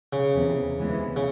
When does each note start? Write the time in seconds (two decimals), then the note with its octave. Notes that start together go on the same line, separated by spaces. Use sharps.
0.13 C#3
0.35 E2 C3 E3
0.78 D2 C3 E3 G#3 B3
1.16 C#3